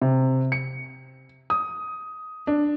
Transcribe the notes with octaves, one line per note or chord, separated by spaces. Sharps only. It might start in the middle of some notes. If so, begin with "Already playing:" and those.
C3
C#7
D#6
D4